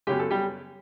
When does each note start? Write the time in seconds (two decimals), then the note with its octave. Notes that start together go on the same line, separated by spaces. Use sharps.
0.07 F#2 C#3 F#3 B3 G4
0.19 A4
0.31 G3 G4